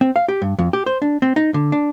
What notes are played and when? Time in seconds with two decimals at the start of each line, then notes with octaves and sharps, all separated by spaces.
0.01 C4
0.16 F5
0.28 G4
0.42 G2
0.59 F2
0.73 G4
0.86 C5
1.02 D4
1.22 C4
1.36 D#4
1.54 D3
1.72 D4